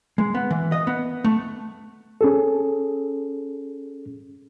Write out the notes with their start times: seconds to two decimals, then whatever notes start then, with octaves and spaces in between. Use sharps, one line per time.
0.18 G#3
0.35 B3
0.51 E3
0.72 D#5
0.87 B3
1.24 A3
2.21 C#4 G#4 A4